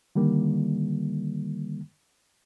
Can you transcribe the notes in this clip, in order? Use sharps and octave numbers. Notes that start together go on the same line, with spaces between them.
D3 D#3 G3 A#3